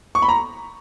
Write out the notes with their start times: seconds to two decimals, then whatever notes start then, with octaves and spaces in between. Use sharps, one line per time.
0.15 C#6
0.22 B5
0.28 A#5